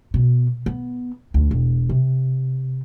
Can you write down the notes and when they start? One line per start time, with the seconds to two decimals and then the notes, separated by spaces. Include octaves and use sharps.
0.14 B2
0.66 B3
1.34 D2
1.51 E1
1.89 C3